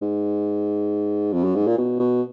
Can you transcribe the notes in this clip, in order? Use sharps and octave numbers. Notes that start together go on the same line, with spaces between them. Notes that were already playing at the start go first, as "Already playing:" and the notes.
G#2
F2
F#2
G#2
A#2
B2
B2